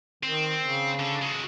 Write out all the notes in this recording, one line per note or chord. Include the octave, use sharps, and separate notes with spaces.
D#3 C4
C#3
D3
G#3 F#4